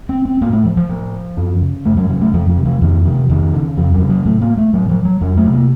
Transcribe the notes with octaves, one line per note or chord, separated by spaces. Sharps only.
C4
C4
A2 A#3
A3
F3
F3
A2
F#2
C#3
F#2 A3
F#3
C#3 F#3
A3
F2 F3
F3
C3
F3
F2 D#3
C3 F3
F2 D#3
C#3
F2 F3
F#3
C#3
F#3
A2 A3
A#3
A3
A2 F#3
F3
F#3
F2 F#3
A3
C3
A#3